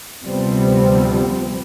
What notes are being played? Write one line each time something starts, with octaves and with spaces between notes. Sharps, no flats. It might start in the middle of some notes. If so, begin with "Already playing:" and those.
D2 C3 F3 G3 B3 C4